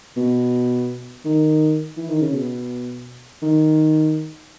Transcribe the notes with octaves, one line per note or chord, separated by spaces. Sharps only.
B2
D#3
E3
D#3
C#3
B2
D#3